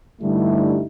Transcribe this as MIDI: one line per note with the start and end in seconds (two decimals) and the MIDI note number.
0.22 0.84 43
0.22 0.84 50
0.22 0.84 55
0.22 0.84 57
0.22 0.84 63
0.22 0.84 64